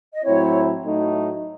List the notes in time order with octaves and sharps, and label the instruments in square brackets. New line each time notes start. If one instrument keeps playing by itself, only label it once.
[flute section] D#5
[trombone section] A2 F#3 C4 E4 [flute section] C#5
[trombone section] A2 F#3 A3 D#4